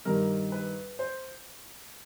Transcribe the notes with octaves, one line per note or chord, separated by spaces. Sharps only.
G2 D#3 G3 A#4
B4
C5